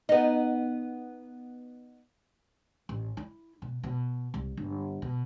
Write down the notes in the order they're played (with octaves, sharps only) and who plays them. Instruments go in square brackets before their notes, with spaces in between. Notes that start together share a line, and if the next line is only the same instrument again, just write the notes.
[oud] B3 D#4
[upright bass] A1
E4
B2
B2
C2
G1
B2